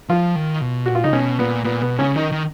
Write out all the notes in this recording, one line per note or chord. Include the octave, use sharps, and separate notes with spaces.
F3 F4
D#3
B2
A#2 F#4
F4
C#3 D#4
B2 C#4
A#2 B3
A#2 B3
B2 B3
C#3 C#4
D#3 D#4
D#3